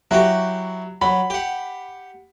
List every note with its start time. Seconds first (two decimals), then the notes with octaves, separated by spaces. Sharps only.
0.11 F#3 E4 F#4 G4
1.01 F#3 B5
1.30 G4 F#5